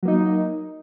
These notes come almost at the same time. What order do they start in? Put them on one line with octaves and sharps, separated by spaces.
F#3 A#3 D#4